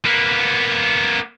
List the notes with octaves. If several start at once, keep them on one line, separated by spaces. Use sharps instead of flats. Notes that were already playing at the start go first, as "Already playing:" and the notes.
A#3 B3